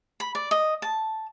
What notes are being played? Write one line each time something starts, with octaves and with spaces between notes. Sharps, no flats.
B5
D5
D#5
A5